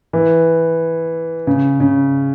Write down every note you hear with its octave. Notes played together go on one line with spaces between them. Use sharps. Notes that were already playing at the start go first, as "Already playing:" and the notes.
E3
C#3
C#3